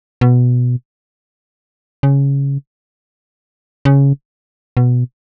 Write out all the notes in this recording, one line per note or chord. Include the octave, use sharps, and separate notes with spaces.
B2
C#3
C#3
B2